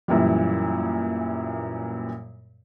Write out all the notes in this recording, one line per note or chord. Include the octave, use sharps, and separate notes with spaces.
F#2 A#2 E3 G3